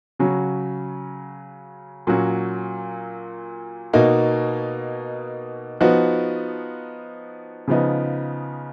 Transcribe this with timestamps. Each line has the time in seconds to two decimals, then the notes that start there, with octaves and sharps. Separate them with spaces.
0.19 C#3 F#3 C#4 F#4
2.07 A#2 F#3 C#4 F#4
3.93 B2 A#3 D#4 F#4
5.81 F3 B3 D#4 F#4
7.68 C#3 F3 B3 D#4